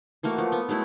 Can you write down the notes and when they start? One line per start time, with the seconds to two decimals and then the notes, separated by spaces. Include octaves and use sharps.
0.23 E3 A3 A#3 F#4
0.38 F3
0.52 B3
0.69 F#3 G#3 A3 E4